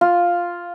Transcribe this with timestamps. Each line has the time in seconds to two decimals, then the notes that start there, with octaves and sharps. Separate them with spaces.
0.01 F4